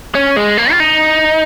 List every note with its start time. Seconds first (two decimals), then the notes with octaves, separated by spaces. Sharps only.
0.15 C#4
0.36 G#3
0.58 A#3
0.71 F4
0.80 D#4